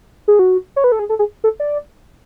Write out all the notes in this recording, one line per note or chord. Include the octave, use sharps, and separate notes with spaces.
G#4
F#4
C#5
B4
A4
G#4
A4
G#4
A4
D5